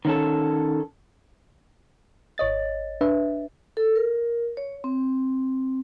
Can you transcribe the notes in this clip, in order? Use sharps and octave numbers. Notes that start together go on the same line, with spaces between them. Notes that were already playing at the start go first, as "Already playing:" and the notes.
D#3 C#4 A4
G#1 C#5 D#5 A6
D4 B4 E5
A4
A#4
C#5
C4